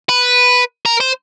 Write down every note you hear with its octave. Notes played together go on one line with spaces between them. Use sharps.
B4
A#4
C5